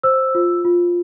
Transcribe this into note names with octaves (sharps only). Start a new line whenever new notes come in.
C5 E6
F4
F4